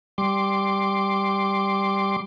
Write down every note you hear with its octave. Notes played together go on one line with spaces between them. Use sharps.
G3 C6 D6